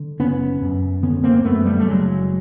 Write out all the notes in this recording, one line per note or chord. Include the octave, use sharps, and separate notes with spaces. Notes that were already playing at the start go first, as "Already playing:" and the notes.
Already playing: D3
F#1 B3 C#4
F#2
D3 B3 C#4
A#3 C4
F#2 A3 B3
G3 A3
A3
F#1 F#3 G#3